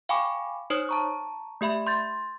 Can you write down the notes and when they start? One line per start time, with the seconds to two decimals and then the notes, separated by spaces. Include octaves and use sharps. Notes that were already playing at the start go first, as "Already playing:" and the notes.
0.09 F5 G5 G#5 B5 C#6 D6
0.70 D#4 C5 C#5 D#6
0.89 A5 A#5 C#6
1.61 A3 G4 E5 B5
1.87 C6 G6 A6